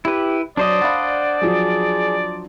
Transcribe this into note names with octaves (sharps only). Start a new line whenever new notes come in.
E4 G4 B4
F#3 D4 C5 D5 D#5
F5 F#5 B5 A6
F3 F#3 G#4